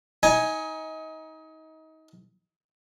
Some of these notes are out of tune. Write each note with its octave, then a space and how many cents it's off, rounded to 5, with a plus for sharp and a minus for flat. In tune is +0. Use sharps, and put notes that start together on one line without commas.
D#4 +30 G#5 +0